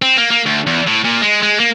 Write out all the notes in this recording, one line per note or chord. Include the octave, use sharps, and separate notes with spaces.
C4
A#3
A#3
D2
E2
A2
A#2
G#3
G#3
A#3